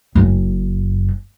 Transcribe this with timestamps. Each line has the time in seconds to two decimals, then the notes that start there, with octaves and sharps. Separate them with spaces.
0.15 F#1